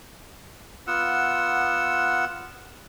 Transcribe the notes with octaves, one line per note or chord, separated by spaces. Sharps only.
B3 F4 F#5 E6